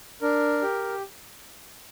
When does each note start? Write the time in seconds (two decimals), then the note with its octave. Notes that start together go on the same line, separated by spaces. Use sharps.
0.21 D4 A#4
0.62 G4